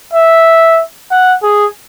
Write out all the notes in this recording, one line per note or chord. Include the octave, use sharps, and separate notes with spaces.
E5
F#5
G#4